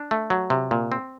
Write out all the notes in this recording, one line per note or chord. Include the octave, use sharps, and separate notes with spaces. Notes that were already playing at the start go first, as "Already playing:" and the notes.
Already playing: D4
A3
F#3
C3
A#2
C4